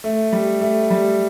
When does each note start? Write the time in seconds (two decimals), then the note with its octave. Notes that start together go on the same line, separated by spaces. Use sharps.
0.04 A3
0.33 G3
0.61 A3
0.91 G3